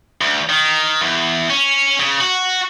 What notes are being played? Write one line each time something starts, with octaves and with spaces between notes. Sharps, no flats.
D2
D#3
E2
C#4
C#3
F#4